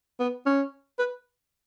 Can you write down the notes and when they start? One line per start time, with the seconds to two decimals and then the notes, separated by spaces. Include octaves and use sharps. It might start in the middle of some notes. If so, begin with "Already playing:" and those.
0.20 B3
0.46 C#4
0.99 B4